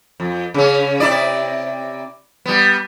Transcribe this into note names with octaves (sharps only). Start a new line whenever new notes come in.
F2
C#3 C#4
C3 E4 D5
G3 B3